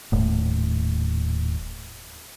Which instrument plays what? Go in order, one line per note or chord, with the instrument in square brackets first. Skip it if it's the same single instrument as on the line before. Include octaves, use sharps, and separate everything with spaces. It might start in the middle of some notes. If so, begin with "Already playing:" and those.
[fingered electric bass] D#1 A2